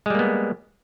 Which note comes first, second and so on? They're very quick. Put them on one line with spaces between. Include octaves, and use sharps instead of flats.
G#3 G3 A#3 B3